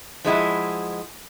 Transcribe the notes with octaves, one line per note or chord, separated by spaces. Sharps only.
F3 G#3 E4 F#5